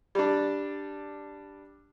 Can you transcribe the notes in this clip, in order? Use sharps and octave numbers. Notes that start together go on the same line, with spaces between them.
G3 D4